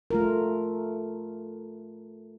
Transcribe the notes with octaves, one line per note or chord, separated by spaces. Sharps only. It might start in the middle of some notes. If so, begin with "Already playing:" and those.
A3 F4 A#4